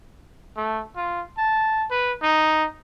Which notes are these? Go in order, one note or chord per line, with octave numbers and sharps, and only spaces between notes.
A3
F4
A5
B4
D#4